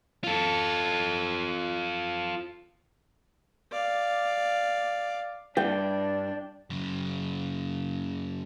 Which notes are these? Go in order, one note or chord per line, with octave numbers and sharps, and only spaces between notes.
F4 A4
D5 F5
G2 D4 G5
F#2 C#3